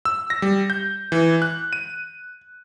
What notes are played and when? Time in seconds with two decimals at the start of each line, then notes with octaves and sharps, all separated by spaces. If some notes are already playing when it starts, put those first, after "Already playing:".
0.05 E6
0.30 A#6
0.42 G3
0.70 G6
1.12 E3
1.42 F#6
1.73 D#7